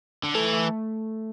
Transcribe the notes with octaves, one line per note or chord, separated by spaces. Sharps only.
D3
E3 A3
A3